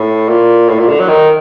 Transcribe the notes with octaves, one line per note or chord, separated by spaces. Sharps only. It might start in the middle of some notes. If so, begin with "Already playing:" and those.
Already playing: A2
A#2
A2
A#2
D3
F#3
D#3